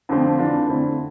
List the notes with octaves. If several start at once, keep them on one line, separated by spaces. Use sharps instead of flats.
F2 D3 F3 A3 C4
E3 A3 D4 F4
F2 D3 A3 C4 E4